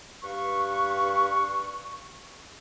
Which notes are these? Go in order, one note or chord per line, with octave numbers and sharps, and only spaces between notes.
G2 B4 F5 C#6